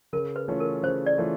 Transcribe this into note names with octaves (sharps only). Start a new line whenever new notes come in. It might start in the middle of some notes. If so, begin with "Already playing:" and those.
C#3 A#4
B4
E3 A3 C#4 F4
A#4
C#3 C5
D5
E3 A3 C#4 F4